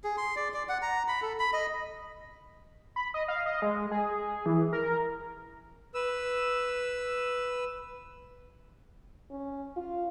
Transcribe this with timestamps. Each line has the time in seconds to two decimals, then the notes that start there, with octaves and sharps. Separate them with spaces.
0.04 G#4
0.17 C6
0.36 D5
0.54 D5
0.69 F#5
0.82 A#5
1.08 B5
1.22 A4
1.39 B5
1.53 D#5
2.96 B5
3.14 D#5
3.28 F5
3.46 D#5
3.62 G#3
3.91 G#4
4.46 E3
4.73 A#4
5.94 B4 E6
9.31 C#4
9.76 F4